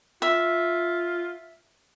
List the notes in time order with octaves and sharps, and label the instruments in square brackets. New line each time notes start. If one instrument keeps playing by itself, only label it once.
[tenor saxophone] F4 [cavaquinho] E5